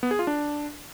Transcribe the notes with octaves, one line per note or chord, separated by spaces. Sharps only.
B3
G#4
F4
D4